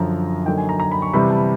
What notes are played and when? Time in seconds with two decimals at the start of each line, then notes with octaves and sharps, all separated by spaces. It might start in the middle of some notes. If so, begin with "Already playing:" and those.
Already playing: F#2 D3 F3 A#5
0.46 D3 F#3 A#3 D#4 G5
0.58 G#5
0.69 A#5
0.80 A#5
0.92 B5
1.02 C#6
1.13 C3 E3 G3 B3 B5
1.30 A5